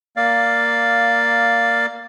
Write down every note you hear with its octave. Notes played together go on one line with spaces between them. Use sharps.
A#3 D5 F5